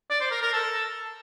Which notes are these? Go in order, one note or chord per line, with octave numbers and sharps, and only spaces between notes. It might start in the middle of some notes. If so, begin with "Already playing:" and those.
D5
C5
A#4
A#4
A4